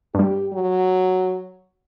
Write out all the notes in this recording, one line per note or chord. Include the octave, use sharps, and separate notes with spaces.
G2 G3 G4
F#3